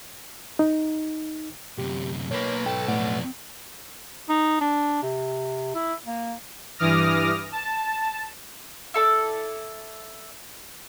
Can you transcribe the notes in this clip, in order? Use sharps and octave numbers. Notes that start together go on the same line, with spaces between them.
D#4
F#2 C3 G4
B1 A#3 B4 C#5
G#2 A4 G5
F2 A2 A3 D5 F#5
D#4
D4
C3
E4
A#3
G2 E3 D6 D#6 F6 A#6
A5
E4 A4 D5